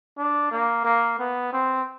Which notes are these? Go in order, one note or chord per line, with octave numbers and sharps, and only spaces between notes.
D4
A#3
A#3
B3
C4